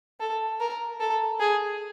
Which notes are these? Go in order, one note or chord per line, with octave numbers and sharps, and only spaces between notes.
A4
A#4
A4
G#4